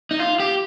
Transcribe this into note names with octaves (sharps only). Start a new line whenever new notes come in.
D#4
F4
G4